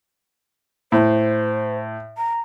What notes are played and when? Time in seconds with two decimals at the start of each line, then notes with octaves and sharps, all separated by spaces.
0.92 A2 C5
2.17 A#5